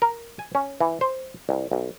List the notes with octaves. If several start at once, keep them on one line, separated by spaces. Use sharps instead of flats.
A#4
G#5
C#4
E3
C5
C2
B1